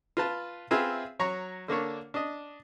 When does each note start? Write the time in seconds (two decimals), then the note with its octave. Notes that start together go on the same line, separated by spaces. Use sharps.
0.17 F4 B4 A5
0.71 C4 F4 G#4 B4 E5
1.19 F#3 C#5 A#5 C#6
1.68 D3 A#3 D4 C#5
2.14 D4 D#5